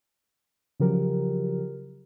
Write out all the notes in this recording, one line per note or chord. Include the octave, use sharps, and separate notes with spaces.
C#3 F3 F#3 G4 A#4